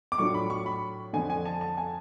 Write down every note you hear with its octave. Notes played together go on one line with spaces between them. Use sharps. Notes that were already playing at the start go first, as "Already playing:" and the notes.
D6
A2 F#3 A3 D4 F4 C#6
B5
C#6
B5
F2 D3 F3 G#5
G#5
A5
A5
G#5